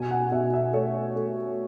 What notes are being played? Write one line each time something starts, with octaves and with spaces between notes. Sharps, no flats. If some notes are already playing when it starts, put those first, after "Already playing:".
Already playing: B2 G#5
F#5
B2 E5
E5
A3 C#5
A3